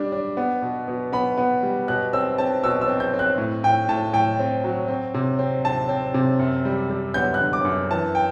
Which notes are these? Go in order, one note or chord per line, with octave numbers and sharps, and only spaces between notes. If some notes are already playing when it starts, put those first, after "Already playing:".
Already playing: G3 D4
D4
B3
B2
B2
B3 B5
B3
G3
B2 F#6
C4 E6
C4 A5
B2 E6
E6
C4
G6
C4
F#6
A2
A2 G5
A2 A5
A2 G5
C4
F#3
C4
C3
C4
C4 A5
C4
C3
F#2
G3
G3
B3 G6
F#6
D3
D6
F#2
E3 A5
G5